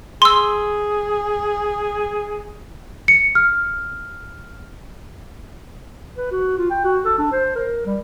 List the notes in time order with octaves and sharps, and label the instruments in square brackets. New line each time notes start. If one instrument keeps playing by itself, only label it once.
[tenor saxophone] G#4 [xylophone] C6 E6
[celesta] C#7
F6
[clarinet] B4
F#4
F4
G5
F#4
A4
D4
C5
A#4
G3